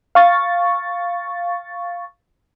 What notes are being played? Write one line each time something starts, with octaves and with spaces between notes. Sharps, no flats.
F5 C#6 A6